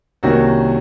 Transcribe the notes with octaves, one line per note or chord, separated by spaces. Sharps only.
C2 C3 D#3 A#3 C#4 F#4